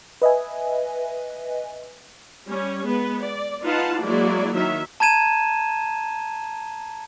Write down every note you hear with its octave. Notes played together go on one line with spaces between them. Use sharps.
B4 D#5 E5 G#5
G3 C#4 C#5
G#3 B3 B4
D5
D#4 F4 B4 F5 F#5 A5
F#3 G#3 A#3 E4 F#4 D5
D#3 F#3 E5
A5 A#5 G#6 D#7 E7